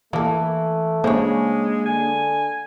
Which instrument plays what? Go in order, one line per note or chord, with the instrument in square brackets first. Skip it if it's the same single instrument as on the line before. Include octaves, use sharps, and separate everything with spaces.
[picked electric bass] E3 [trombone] A3 [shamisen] A#3 A4
[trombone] C#3 [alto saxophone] G#3 [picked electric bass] A#3 B3 D4 [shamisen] C5 C#5
[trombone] D3 [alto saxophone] G#5